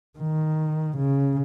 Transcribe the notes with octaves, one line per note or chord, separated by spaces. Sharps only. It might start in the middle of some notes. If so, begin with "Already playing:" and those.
D#3
C#3